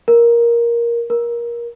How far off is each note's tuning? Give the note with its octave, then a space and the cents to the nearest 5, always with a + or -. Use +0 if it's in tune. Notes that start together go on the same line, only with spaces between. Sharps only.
A#4 +10
A#4 +20